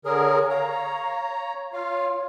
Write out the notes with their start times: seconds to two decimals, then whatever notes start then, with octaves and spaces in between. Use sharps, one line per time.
0.05 D3 G#4 A#4 C#5
0.50 C#5 F5 A#5
1.73 F4 C#5 F5